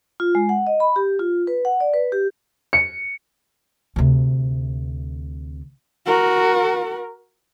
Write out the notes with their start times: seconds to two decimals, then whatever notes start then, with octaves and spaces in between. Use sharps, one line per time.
0.20 F4
0.35 G#3
0.49 F#5
0.67 D#5
0.80 B5
0.96 G4
1.20 F4
1.47 B4
1.65 F#5
1.80 D5
1.94 B4
2.12 G4
2.73 C#7
3.96 D2 C3
6.06 F#4 A#4